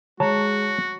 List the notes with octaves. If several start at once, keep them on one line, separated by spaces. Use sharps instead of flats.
G#3 F#4 C#5 A5 A#5